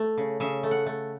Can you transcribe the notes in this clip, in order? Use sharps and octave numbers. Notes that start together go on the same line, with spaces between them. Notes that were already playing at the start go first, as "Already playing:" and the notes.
Already playing: A3
C#3
C#3 E5
A3
F#5
A3